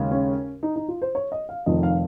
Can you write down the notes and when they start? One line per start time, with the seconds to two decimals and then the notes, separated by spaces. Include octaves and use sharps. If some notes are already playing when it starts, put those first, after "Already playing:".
Already playing: D#2 C#3 G#3
0.11 C#4
0.63 D#4
0.76 D#4
0.88 F4
1.02 C5
1.15 C#5
1.32 D#5
1.49 F5
1.66 F1 F2 D#3 D#5
1.83 F5